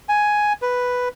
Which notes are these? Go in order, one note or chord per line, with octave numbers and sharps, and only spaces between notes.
G#5
B4